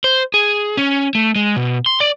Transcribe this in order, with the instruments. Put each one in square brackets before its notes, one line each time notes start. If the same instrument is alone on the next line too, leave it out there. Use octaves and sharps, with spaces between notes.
[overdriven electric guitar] C5
G#4
C#4
A3
G#3
B2
C6
D5